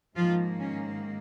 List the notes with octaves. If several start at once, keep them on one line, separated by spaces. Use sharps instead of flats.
G#2 D#3 F3 A#3 F4
C#4